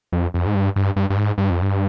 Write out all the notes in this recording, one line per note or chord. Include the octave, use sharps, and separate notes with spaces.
F2
F2
G#2
G2
G2
G2
G2
G#2
G2
F2
G2